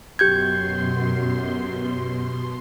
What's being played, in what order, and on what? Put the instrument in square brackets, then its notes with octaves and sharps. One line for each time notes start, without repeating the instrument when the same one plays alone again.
[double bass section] F#2 [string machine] B2 C6 [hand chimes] G4 G6 G#6